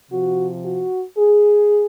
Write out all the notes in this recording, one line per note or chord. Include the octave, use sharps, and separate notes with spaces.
C3 F3 F#4
F#4
G#4